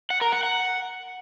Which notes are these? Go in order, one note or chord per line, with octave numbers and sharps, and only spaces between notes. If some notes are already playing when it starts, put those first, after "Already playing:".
F#5
A#4
F#5
F#5